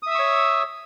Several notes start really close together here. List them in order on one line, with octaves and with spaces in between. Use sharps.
D#6 E5 E6 C#6 C#5